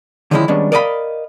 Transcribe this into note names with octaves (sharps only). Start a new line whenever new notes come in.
D3 D#3 F3 G#3 C#4 E4
D#3 G3 G#3 B3 C#4 D4
A#4 D5 D#5 F5 G5 B5